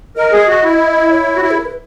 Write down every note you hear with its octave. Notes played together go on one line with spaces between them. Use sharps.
A#4 D#5
G#4
F#4
E4
C#5
F#4
E4
G#4
A#4
B4